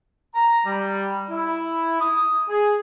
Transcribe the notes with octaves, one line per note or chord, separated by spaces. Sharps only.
A#5
G3
E4
D#6
G#4